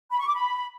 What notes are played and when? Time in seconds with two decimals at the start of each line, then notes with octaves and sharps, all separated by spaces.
0.12 B5
0.19 C#6
0.27 D6
0.35 B5